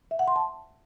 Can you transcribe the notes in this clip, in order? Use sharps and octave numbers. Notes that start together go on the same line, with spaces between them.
E5
F#5
C6
A5